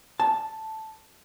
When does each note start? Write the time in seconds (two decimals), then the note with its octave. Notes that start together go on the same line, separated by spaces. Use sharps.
0.20 A5